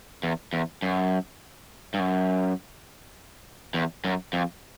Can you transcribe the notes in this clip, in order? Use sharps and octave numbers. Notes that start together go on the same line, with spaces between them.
E2
E2
F#2
G2
F#2
E2
F#2
F2